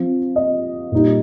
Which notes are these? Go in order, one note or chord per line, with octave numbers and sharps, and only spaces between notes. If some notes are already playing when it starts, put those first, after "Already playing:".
Already playing: F3 C4 F4
D#5
A#2 G3 D#4